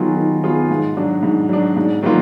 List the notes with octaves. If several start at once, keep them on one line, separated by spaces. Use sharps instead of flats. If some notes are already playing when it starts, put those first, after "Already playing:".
Already playing: D#3 F#3 B3 F4 G#4
D#3
F#3 B3 F4 G#4
G#2
F#3 D4
G#2
F#3 D4
G#2
D#3 F#3 A#3 F4